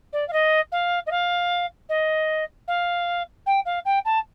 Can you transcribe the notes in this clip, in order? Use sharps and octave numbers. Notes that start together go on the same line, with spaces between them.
D5
F5
D#5
F5
D#5
F5
D#5
F5
G5
F5
G5
A5